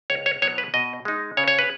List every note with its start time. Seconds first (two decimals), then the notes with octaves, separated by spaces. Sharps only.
0.10 C#2 C#5
0.26 C#5
0.42 B2 F#3 B3 E4 C#5
0.58 B4
0.74 B2 D#5
1.05 G#3 D#4
1.37 C#3 C#5
1.48 C#5
1.59 B4